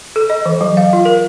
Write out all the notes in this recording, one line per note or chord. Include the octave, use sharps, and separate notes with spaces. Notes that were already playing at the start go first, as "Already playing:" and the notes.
A4
D#5
E3
F#3
F5
F4
A#4